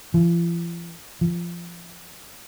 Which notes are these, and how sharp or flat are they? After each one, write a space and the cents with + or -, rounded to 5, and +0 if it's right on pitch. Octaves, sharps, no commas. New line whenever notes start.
F3 -45
F3 -20